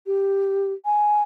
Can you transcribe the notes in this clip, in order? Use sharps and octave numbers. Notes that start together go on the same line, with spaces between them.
G4
G#5